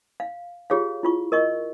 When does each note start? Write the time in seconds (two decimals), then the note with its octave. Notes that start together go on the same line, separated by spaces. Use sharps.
0.20 F5
0.70 F4 G4 G#4 C#5 F5
1.03 E4 F4 C#6
1.32 A#4 D#5 C#6